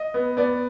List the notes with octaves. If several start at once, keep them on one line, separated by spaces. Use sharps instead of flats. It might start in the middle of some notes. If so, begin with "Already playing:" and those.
Already playing: D#5
B3
B3 D5